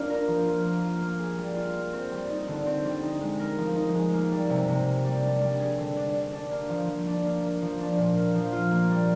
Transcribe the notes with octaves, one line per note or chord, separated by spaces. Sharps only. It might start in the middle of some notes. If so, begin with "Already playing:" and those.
Already playing: A#3 D4 F4 G4
A#4
F3
F4
A#3
F4
A#3
G#4
G3
F4
A#3
C4
G3
D#4
D3
C4
G3
D#4
G#3
A#4
F3
D#4
G#3
A#3
G3
C3
C3
A#3
G3
D4
G3
G#4
D3
D4
G3
D4
A#3
F3
F3
D4
A#3
A#3
F3
D4
A#2
A#3
F3
F4
A#3
G3